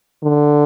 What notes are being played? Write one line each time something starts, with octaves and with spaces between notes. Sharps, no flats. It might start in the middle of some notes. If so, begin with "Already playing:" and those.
D3